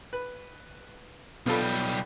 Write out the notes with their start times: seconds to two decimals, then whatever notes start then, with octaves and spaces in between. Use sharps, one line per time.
0.13 B4
1.46 B1 G3 B3 F4 A4